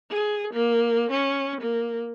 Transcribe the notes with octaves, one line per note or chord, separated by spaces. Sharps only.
G#4
A#3
C#4
A#3